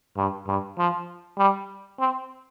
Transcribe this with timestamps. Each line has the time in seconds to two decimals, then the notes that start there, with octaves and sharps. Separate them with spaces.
0.17 G2
0.47 G2
0.78 F3
1.38 G3
2.00 C4